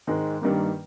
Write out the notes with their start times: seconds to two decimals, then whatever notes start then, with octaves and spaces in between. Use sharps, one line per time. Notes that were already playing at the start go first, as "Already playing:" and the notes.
0.07 G#2 D#3 G#3
0.42 G2 D#3 G3 A#3